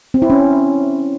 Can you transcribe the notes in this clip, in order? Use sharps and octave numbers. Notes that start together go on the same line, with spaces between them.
C4
E4
C#4